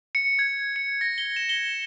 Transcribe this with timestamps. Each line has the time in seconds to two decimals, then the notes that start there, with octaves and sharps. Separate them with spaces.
0.15 C#7
0.39 G#6
0.76 C#7
1.01 A#6
1.18 G7
1.36 E7
1.49 G7